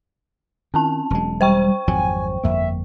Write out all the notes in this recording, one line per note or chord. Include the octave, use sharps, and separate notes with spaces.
D#3 C4 C#4 A5
E1 F#3 G#3
G3 C5 G5 C#6
G#1 F2 F#3 G#5
G1 F2 A#3 E5